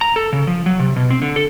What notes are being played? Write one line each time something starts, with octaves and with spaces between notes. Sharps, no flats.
A#5
A4
C#3
F3
F#3
C3
B2
C4
D3
A4